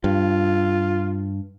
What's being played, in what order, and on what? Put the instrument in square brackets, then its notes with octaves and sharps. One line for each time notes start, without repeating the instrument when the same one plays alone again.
[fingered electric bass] G2 [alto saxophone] F4